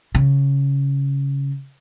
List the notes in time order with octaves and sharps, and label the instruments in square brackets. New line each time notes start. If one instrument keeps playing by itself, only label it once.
[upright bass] C#3